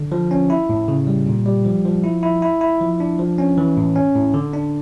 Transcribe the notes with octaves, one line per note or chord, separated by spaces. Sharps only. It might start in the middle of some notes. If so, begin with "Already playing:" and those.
Already playing: D3
F3
C#4
E4
A2
C#3
G3
A#2
G3
F3
F3
E4
E4
E4
E4
F3
D4
F3
C#4
E3
A2
C#4
A2
D3
D4